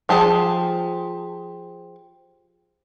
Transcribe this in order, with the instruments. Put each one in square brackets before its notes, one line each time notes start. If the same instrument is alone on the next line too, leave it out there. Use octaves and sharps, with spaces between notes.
[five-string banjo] F3 G4 G#4 A5